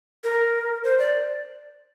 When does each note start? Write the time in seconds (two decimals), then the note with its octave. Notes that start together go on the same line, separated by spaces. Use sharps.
0.24 A#4
0.84 C5
0.99 D5